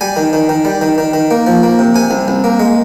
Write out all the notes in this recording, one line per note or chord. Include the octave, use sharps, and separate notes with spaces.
G3 G#5
D#3
D#3
D#3
G3
D#3
D#3
D#3
A#3
F3
A#3
C3
C3 G#5
C2
C2
A#3
G#3